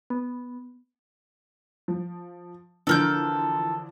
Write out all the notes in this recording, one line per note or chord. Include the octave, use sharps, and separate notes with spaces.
B3
F3
D3 E3 F3 A4 A#4 G6